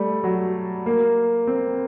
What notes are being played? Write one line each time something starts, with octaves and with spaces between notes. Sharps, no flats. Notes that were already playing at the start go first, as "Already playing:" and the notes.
Already playing: G3 A3
F#3
A#3
C4